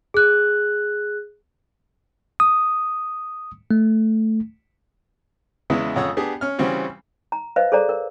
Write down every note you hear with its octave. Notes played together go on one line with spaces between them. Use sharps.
G#4 F#6
D#6
A3
E2 C#3 G#3 B3 E4
F2 C#3 C#5 F#5 D#6 E6
B3 D4 G4 G#4
C#4 F6
C#3 E3 G3 C4 C#4 F#4
A#5
B4 C5 D#5 F5
G#4 A4 C5 D5 A#5
A#4